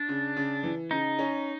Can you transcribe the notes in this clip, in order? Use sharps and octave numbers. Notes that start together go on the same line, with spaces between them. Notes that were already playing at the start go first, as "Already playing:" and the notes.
Already playing: D4
C#3
C#3
E3
C#3 D#4
C#4